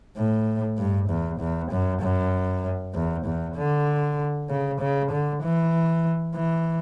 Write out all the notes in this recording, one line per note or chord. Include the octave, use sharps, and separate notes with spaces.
A2
G2
E2
E2
F#2
F#2
E2
E2
D3
C#3
C#3
D3
E3
E3